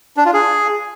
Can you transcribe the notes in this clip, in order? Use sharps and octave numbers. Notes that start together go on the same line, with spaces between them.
D4
F4
G#4